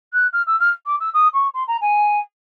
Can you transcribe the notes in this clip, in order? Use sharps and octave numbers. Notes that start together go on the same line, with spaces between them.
F#6
F6
E6
F6
D6
E6
D#6
C#6
C6
A#5
G#5